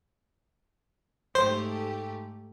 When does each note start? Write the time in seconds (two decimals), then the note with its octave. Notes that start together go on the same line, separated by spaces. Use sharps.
1.35 G#2 A3 G4 C5